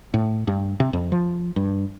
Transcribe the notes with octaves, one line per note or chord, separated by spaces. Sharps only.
A2
G2
C3
F2
F3
G2